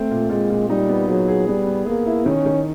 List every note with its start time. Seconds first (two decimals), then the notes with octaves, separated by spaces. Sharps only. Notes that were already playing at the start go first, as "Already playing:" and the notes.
Already playing: A3 C4
0.11 A#2
0.29 A#2 G#3
0.49 A#2
0.69 G3 D#4
0.89 B3
1.08 F#3 G#4
1.28 G#4
1.47 G3 B3
1.67 B3
1.86 A#3 G#4
2.06 E4
2.26 D#3 C#4
2.46 D#3